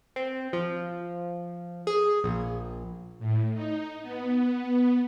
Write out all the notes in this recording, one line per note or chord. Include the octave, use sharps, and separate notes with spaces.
C4
F3
G#4
A#1
A2
D#4
B3